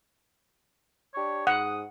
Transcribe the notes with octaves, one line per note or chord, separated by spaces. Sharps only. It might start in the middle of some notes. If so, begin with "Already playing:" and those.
D4 G4 C#5
G#2 F#5 D#6